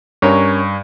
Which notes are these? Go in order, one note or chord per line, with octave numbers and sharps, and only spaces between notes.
G2 C#4 A#4 C#5